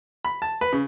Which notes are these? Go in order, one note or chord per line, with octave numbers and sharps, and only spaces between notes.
B5
A5
B4
C#3